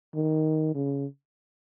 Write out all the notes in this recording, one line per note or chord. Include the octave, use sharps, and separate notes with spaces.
D#3
C#3